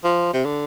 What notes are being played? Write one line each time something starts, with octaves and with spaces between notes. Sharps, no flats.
F3
C3
D3